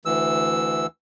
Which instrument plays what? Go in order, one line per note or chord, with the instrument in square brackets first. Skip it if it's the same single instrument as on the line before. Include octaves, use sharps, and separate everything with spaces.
[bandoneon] D2 E3 E6